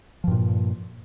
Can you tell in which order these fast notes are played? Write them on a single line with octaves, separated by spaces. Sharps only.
F3 G2 A#2